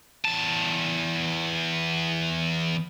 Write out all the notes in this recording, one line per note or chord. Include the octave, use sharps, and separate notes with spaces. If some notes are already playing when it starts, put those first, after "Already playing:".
E2 A5